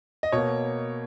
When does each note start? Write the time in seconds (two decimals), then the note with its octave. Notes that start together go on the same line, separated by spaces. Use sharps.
0.23 D#5
0.32 B2 A#3 C#5